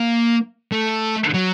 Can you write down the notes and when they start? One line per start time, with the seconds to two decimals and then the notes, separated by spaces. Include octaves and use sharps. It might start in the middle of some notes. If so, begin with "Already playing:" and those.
Already playing: A#3
0.72 A3
1.34 F#3